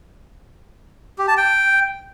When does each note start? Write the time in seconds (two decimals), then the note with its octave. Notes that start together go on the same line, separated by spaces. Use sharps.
1.18 G4
1.28 A5
1.37 G5